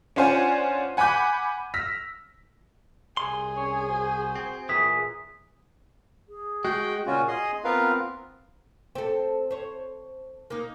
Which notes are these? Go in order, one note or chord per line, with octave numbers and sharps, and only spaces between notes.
C#4 D4 F4 C5 F#5 G#5
F#5 G#5 B5 D6 F#6 G6
E6 F6 A#6 B6
C2 G#4 C6
C#4 C#5
F#4 C5
C4
A#2 E3 G#4 D#6 B6
G#4
G#3 F#4 G5
A#2 C#3 C#4 F4 F#4
G#4 D#5 C6 D#6
B3 C4 F4 A#4 B4 F5
C4 A4
C5 C#5
A#3 D#4